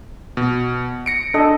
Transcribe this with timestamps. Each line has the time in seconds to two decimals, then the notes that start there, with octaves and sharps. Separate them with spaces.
0.37 B2
1.06 A#6 C#7 D7
1.34 D4 A4 D#5